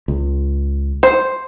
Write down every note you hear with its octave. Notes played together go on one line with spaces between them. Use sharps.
C#2
C5